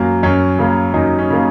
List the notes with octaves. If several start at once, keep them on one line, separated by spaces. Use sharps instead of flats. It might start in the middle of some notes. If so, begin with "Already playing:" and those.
Already playing: F#2 A#3
F#2 C#4
C#3 A#3
F#2 D#4
C#4
C#3 A#3